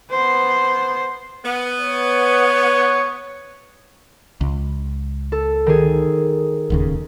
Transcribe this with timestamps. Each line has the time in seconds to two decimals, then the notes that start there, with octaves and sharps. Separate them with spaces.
0.11 B3 C5
1.44 B3
1.81 C#5
4.41 C#2
5.32 A4
5.66 D#3 G#4
6.70 D1 D#2 C#3